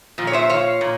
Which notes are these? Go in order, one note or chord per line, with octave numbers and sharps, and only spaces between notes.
A#2 F3
C#5
C5 E5
C#5 F5
A#2